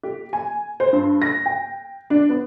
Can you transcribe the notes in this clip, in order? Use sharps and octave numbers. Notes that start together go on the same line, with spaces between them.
G4
G#5
C5
G2
A#6
G5
D4
B3